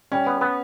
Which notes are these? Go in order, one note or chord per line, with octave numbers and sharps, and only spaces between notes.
G3 C#4
B3
B3